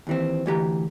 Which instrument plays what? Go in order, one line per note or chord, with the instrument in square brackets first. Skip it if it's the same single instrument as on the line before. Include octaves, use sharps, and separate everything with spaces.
[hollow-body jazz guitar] D#2 E3 C4
D2 E3 G4 A#5